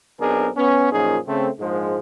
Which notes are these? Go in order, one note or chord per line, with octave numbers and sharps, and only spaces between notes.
B1 B2 C4 D4 G#4 A#4
B3 C#4
F#2 A#2 F3 C#4 D#4 G#4
C#3 A3 C4
A#1 G#2 F3 G#3